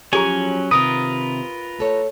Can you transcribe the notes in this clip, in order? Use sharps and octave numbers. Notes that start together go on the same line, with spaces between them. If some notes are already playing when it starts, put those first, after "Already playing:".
F3 F#3 C#4 G4 G#4 G#5 A#5
C3 D#3 C4 F4 A#4 B4 D#6
A3 A4 C#5